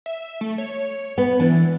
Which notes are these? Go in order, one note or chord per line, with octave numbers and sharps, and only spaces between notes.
E5
A3
C#5
B3
E3 D4